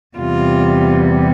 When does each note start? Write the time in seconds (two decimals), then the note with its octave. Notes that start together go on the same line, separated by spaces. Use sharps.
0.17 E2 C3 G3 F4